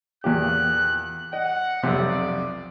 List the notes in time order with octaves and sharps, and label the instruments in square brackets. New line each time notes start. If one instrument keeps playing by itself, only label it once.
[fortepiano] E2 A#2 G4 [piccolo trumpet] F#6
[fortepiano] D#5 [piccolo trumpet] F#5
[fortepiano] B1 F2 C3 [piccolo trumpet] D5